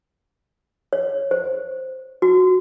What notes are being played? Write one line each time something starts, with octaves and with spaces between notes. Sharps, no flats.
C#5
C5
F#4